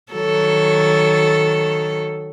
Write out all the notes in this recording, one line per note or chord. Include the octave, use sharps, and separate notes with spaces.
D#3 F#3 A4